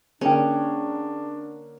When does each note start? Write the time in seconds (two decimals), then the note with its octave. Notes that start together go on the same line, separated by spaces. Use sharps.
0.21 D3 A#3 C#4 D4 G#4 G5